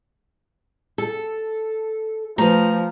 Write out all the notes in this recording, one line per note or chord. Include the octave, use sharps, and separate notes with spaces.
A4
F3 A3 B4 A#5